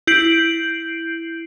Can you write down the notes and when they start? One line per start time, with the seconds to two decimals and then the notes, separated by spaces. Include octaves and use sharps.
0.07 E4 G6 C7 D7 F#7